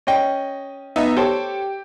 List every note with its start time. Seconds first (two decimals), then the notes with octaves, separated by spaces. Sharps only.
0.07 C#4 D#5 G5
0.96 B3 D#4 E5
1.16 G4 A4 C5 C#5